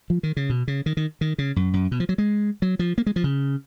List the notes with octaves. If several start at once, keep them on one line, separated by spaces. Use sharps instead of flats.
F3
D#3
C#3
B2
C#3
D#3
D#3
D#3
C#3
F#2
F#2
B2
F3
F#3
G#3
F#3
F3
A#3
G#3
F3
C#3